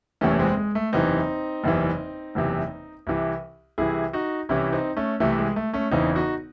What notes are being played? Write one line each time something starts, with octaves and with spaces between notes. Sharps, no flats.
F#1 E2 C3 E3 A3 C#4
G#3 C4
G#3
A3
F#1 E2 C3 E3 C4 D#4
F#1 E2 C3 E3
F#1 E2 C3 E3
C2 C3 E3
C2 C3 E3 E4 G#4
D#4 F#4
C2 C3 E3 C#4 E4
C4 D#4
A3 C#4
C2 C3 E3 A3
G#3
A3
A3 C#4
E1 E2 C#3 E3 C4 D#4
D#4 F#4